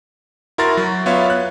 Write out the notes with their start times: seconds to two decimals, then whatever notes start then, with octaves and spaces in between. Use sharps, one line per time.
0.58 E4 F#4 A#4 C6 A6
0.77 F#3
1.06 B3 F4 C#5 E5 F5
1.30 F#6